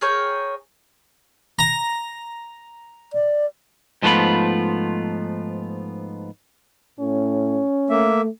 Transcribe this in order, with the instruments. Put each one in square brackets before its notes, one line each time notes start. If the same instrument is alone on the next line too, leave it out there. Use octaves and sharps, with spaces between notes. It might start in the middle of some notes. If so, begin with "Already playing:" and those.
[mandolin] G#4 A#4 C#5 G5
[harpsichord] A#5
[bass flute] D5
[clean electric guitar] G#2 F3 A3 B3 F4 B5
[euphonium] A2 [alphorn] C#4
[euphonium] A3 [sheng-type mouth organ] A#3 E5